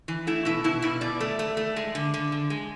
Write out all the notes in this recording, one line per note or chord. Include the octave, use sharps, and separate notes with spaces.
E3
A3 E4
B2 E4
B2 E4
B2 E4
B2 D5
A3
A3
A3
G#3
D3
D3
D3
G#3